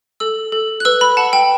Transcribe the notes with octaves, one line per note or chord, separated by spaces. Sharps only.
A4 E6
A4
F#6
B4 E6
B5
F#5 A5
G5